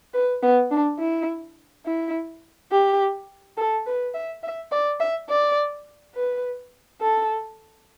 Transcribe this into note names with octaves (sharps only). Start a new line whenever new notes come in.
B4
B3
D4
E4
E4
G4
A4
B4
E5
E5
D5
E5
D5
B4
A4